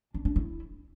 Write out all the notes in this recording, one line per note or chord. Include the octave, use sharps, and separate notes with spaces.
D4
D4
E4